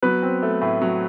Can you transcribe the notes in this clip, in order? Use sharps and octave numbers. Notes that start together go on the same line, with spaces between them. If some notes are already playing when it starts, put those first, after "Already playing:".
F#3 B3 B4
C4
A3
A2
F#3